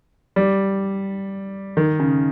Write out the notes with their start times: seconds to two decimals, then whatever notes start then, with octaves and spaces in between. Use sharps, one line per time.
0.36 G3
1.77 D#3
2.00 C#3